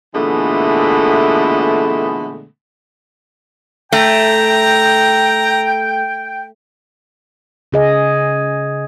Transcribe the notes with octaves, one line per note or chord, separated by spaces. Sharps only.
A#2 D3 E3 G#3 A3 B3
A3 G5 A#5
C#3 G#4 D#5